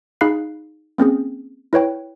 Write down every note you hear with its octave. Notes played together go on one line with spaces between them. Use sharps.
D#4 G#4 F5 B5 F#6 C7
A#3 C4 C#4 G#4
E4 B4 C#5 G5